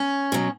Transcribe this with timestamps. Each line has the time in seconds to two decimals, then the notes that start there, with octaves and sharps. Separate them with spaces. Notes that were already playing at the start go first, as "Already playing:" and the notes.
Already playing: C#4
0.32 B2 F#3